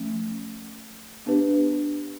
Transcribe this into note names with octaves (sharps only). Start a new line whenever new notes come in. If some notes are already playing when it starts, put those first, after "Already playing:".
Already playing: F3 A3 C#4
B3 D4 G4 B4